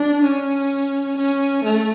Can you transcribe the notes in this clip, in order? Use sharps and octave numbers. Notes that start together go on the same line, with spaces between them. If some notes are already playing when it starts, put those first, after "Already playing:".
Already playing: D4
C#4
C#4
A3